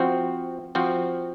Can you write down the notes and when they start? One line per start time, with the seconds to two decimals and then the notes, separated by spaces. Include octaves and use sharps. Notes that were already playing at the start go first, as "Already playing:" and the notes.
Already playing: F3 C4 F#4
0.75 F3 C4 F#4